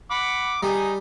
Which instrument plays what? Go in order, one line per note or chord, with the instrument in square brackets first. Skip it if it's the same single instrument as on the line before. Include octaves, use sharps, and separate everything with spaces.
[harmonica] F#5 B5 D6
[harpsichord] G3 [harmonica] D#4 G#4 A#5